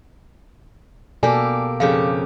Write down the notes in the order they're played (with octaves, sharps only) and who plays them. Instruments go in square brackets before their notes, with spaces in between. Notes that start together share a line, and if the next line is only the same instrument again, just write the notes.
[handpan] B2 A4 [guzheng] A#3 G4 [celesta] D5 G#5
[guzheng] F2 C#3 G4 [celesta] F5